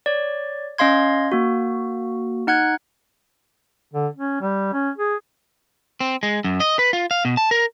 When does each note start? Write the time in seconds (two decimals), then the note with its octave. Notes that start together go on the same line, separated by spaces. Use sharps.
0.06 C#5 D5
0.78 C#4 D#5 F5 C6 G#6
1.32 A#3 F#4
2.47 D#4 F#5 F#6 G#6
3.93 D3
4.16 C#4
4.41 G3
4.73 C#4
4.98 G#4
6.00 C4
6.23 G#3
6.44 F#2
6.60 D#5
6.79 B4
6.93 F4
7.11 F5
7.25 B2
7.37 A5
7.51 A#4